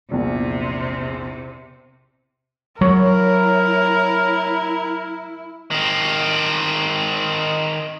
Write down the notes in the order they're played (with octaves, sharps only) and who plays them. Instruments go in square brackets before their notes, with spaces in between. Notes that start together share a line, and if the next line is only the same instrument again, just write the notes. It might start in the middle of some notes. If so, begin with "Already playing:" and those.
[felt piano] A#1 E2 [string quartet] C3
[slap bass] F#3 [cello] E4 [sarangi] A#4 [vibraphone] C#5
[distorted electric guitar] D#3 C4